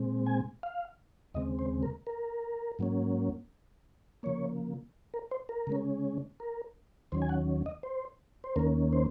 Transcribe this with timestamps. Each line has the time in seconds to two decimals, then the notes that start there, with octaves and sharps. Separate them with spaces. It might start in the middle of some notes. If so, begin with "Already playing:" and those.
Already playing: A#2 G#3 C4
0.26 G#5
0.63 F5
1.34 D#2 C#3 G#3 C4 D#5
1.59 C5
1.83 A#4
2.07 A#4
2.79 G#2 F#3 A#3 C#4
4.23 C#3 F3 A#3 C#5
5.14 A#4
5.31 C5
5.49 A#4
5.67 C#3 G#3 C#4
6.40 A#4
7.12 D#2 D#3 F#3 C#4 C5
7.22 G#5
7.29 F#5
7.66 D#5
7.83 C5
8.44 C5
8.56 D#2 D#3 A#3 C#4 A#4
8.93 C5